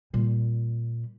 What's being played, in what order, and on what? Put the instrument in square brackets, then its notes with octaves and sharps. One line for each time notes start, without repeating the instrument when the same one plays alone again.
[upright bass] A#2 G3